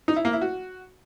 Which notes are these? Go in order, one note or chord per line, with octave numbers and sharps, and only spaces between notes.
D#4
E4
A#3
E4
F#4